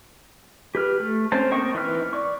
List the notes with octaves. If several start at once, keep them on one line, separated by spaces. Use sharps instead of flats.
G4 B4 F6
A3
C4 C#4 C5 A5
A#3 C4 D#5 G5 C#6
E3 D#4 B4 F6
D5 C#6